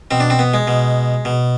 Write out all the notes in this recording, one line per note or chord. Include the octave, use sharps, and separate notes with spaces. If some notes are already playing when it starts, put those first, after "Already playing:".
B2 C4
D4
C4
B3
G#3
B2
B2